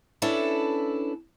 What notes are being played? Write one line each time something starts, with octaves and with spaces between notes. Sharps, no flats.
C#4 D4 E4 A4 B4